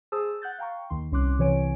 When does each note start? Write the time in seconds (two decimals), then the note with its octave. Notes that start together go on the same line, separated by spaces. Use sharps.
0.12 G#4 C5 A5 D#6 E6
0.42 F#5 F#6 G6 A6
0.58 F5 G5 A#5 C#6
0.90 D#2 D#3 C6
1.12 C2 C#4 C6 D6 F#6
1.38 C2 C3 E3 C#5 G#5 D7